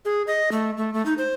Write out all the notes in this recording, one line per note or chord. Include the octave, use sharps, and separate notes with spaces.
G#4
D#5
A3
A3
A3
D#4
C5